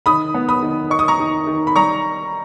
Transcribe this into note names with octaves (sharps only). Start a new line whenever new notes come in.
D#3 B5 D#6
B3
B5 D#6
D#3
D#4 C#6
D#6
A#5 C#6
D#3
D#3
B5
G3 A#5 C#6